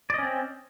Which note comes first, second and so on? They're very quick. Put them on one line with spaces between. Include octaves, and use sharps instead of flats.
D5 D#5 C#4 C4